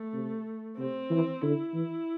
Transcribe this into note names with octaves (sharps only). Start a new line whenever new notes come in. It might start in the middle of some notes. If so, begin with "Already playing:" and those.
Already playing: A3
C3
C3 C4
E3
D3 E4
E3